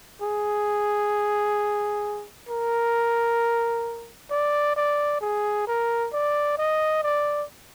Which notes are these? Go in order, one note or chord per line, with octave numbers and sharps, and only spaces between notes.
G#4
A#4
D5
D5
G#4
A#4
D5
D#5
D5